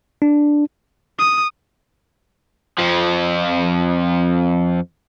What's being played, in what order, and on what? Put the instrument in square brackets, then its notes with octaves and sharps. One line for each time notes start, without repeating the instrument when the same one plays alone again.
[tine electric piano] D4
[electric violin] D#6
[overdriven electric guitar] F2 F3